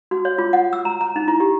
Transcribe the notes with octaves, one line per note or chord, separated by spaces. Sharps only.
F#4
C#5
F4
F#5
E6
A#5
A#5
D#4
E4
G4